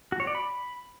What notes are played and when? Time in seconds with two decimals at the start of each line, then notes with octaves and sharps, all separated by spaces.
0.12 F#4
0.20 C#5
0.27 D5
0.35 B5